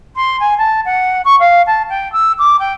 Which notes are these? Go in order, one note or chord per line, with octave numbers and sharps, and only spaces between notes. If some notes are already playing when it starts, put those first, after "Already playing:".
C6
G#5
A5
F#5
C#6
F5
A5
G5
E6
D6
G5